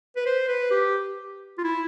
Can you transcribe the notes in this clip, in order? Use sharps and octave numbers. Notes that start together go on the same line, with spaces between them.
B4
C5
B4
G4
F4
E4